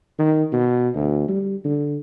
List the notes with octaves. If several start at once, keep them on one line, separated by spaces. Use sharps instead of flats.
D#3
B2
D2
G3
D3